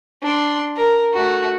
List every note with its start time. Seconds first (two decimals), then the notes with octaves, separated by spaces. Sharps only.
0.23 D4 C6
0.77 A#4
1.13 A3 F#4